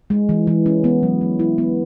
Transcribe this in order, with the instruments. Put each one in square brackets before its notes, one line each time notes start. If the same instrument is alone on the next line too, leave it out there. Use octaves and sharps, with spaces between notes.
[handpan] G#3
E3
E3
C#4
B3
F#3
F#3
E4
B3